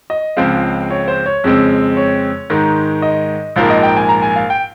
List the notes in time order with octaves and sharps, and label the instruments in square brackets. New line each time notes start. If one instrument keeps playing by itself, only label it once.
[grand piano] D#5
C#2 C#3 F3 G#3 C4 F5
C#5
C5
C#5
F2 C#3 G#3 C4
C#5
G#2 D#3 G#3
D#5
A#1 G#2 F3 A#3 F5
D#5
G5
G#5
A#5
G#5
F5
G5